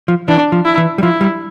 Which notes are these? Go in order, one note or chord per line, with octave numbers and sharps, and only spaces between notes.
F3
E3 D4
F3
E4
E3
G3
F3 E4
G3